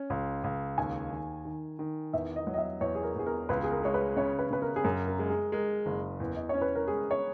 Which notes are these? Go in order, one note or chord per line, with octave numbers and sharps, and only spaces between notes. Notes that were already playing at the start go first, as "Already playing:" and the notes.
Already playing: C#4
C#2
C#2
D#2 G#5
D#3
D#3
D#3
E2 E5
D#5
F#3
D#5
E5
E2 C#5
G#4
A#4
E2 G#4
A#4
C#2 B4
G#4
A#4
G#3 C#5
B4
C#3 C#5
B4
C#3 B4
A#4
G#4
F#2 A#4
A#4
G#3
G#4
G#3 A#4
F#1
E2
D#5
C#4 C#5
B4
A#4
G#3 G#4
C#5